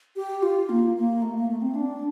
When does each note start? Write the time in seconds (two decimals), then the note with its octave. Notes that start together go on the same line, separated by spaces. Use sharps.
0.16 G4
0.42 F4
0.69 A#3
0.96 A#3
1.22 A3
1.35 A#3
1.48 A3
1.62 C4
1.75 D4